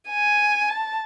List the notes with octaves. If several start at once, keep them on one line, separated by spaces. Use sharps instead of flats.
G#5
A5